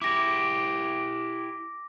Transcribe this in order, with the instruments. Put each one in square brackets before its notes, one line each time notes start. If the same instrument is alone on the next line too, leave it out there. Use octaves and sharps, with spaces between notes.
[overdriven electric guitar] E4 G4 [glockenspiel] D6 A#6